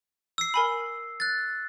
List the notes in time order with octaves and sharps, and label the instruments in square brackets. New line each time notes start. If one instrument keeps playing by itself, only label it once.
[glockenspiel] E6 C7
[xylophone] A#4 G#5 B5
[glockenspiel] F#6 A6